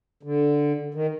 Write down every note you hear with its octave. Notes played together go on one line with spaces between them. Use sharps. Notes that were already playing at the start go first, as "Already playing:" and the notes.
D3
D#3